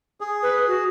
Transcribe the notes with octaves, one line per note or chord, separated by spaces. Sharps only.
G#4
B4
F#4